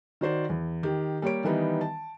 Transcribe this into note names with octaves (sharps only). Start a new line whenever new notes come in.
D#3 F#4 C5 D5
E2
D#3 G4
G3 A#3 G4 C#5 D7
D#3 E3 G3 B3 D#4
A5